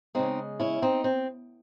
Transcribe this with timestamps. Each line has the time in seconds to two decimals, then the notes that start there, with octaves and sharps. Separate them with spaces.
0.15 C#3 G#3 C4 D#4
0.60 C#4 E4
0.82 C4 D#4
1.04 C4